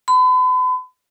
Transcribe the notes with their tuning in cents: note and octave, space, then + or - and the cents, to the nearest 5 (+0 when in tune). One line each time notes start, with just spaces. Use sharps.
B5 +40